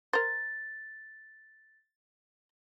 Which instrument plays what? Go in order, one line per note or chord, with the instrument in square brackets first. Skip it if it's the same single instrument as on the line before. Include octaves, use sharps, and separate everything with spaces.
[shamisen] A#4 C5 [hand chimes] A6